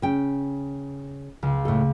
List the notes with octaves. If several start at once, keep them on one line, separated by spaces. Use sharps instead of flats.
C#3 G5
C#2
A2 A4